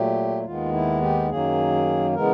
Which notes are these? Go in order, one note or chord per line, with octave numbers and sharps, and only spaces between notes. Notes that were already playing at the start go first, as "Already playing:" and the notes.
Already playing: A#2 F#3 A3 G4
D#2 D#3 G#3 B3 F4
E4
G4
F#2 D#3 F#3 A#3 G#4
C#3 E3 G#3 B3 A#4